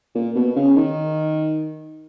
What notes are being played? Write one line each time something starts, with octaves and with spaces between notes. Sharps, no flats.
A#2
B2
C#3
D#3